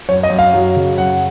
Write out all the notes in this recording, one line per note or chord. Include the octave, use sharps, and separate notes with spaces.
F#2 C#5
D#5
F#2
F5
F#3
C#3
F#2 F#5